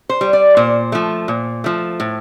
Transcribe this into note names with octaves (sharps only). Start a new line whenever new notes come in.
C5
G3
D5
A#2 C5
F3 A3
A#2
F3 A3
A2